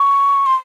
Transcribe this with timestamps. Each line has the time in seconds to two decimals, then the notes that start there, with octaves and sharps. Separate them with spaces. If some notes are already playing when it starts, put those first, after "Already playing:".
Already playing: C#6
0.46 C6